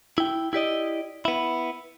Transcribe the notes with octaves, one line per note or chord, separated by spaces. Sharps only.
E4 G5
E4 G4 D5 D#5
B3 E4